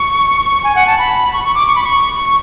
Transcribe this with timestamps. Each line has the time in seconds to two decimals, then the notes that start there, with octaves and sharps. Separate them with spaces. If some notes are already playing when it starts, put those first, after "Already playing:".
Already playing: C#6
0.64 G#5
0.75 F#5
0.87 A5
0.98 B5
1.33 C#6
1.44 C#6
1.55 D6
1.67 C#6
1.76 B5
1.83 C#6